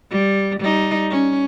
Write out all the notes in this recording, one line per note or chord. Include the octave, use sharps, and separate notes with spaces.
G3
G3 D#4
C#4